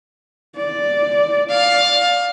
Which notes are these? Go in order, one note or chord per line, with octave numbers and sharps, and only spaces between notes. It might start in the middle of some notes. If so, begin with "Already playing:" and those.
D5
D5 F5